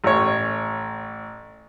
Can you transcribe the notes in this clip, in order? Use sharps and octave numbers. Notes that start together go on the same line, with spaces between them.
A1 C#5